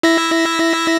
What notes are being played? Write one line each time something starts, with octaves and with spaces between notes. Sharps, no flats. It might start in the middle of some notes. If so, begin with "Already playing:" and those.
E4 E5 A#6